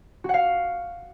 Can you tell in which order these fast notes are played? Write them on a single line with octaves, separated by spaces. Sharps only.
F#4 F#5 F5